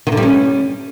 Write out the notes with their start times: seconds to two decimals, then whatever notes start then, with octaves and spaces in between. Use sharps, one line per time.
0.07 D#3
0.12 D3
0.17 G3
0.23 C#4